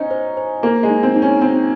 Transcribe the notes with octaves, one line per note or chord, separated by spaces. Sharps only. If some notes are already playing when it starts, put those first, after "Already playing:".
Already playing: C#4 D#4 C5 D#5
C5
C5
A#3 C5
G#3
D#4
C4
D#4
C#4
C4 D#4